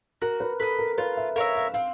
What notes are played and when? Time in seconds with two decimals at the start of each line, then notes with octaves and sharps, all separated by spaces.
0.22 F#4 A#4
0.40 B4
0.60 A4 B4 D#5
0.79 A#4
0.98 F4 B4
1.17 E5
1.36 A#4 C#5 E5 F5
1.56 F5
1.74 C4 F5